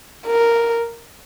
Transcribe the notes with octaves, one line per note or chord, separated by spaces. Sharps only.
A#4